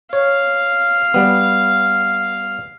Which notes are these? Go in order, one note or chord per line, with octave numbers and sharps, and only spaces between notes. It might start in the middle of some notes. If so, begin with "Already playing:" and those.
C#5 F5
G3 B3